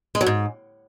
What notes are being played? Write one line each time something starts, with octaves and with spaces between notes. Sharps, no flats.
G#3
F#3
G#2